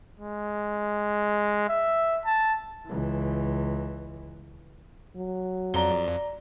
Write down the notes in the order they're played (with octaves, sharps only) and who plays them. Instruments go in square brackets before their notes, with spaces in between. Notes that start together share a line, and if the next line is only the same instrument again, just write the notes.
[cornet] G#3
E5
A5
[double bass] C#2 E3
[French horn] F#3
[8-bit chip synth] F2 [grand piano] D5 A#5 G7